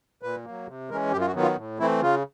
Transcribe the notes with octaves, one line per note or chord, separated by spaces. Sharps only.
A#2 B4
F#3 A#3
C3
E3 G#3 C#4 A#4
F#2 G4
F4
F#4
D#3 F#3 B3
F4
A2
E3 A3 C4 E4
C#3 F4